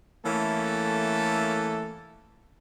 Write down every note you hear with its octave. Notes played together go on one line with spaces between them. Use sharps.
E3 A3 A#3 C#4 A4